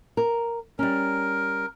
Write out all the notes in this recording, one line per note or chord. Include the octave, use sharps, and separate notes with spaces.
A#4
G3 C#4 A#4